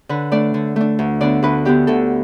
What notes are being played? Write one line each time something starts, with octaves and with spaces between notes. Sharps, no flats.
D3 B4
A3 D4 D5
D3
A3 D4
D2
D3 B3 D4 D5
D2 B4
D3 B3 D4 G4
D2 A4